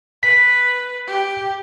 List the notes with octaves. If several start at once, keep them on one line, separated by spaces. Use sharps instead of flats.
B4 B6
G4